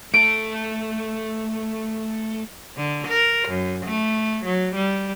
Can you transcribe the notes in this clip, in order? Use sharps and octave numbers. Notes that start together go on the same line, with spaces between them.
A3 A4 D7
D3
A#4
F#2
A3
F#3
G3